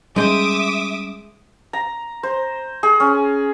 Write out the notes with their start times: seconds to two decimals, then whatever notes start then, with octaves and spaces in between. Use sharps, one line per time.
0.16 G3 G#3 C#4 E5 G5 D6 D#6
1.73 A#5
2.23 C5
2.83 G#4
3.00 C#4